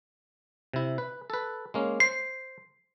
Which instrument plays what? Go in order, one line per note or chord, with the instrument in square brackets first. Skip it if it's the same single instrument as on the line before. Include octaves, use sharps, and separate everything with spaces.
[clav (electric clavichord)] C3 E4
B4
A4 B4
G#3 A#3 C#4
[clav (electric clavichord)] C5 [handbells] C7